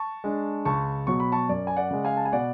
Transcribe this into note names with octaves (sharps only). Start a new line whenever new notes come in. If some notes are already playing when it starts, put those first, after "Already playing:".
Already playing: A5 C#6
G#3 D4
C#2 A5 C#6
B2 F#3 C#6
B5
A5 C#6
F#2 D5
G#5
D5 F#5
C#3 G#3
F5 G#5
A5
G#5
B2 D5 F#5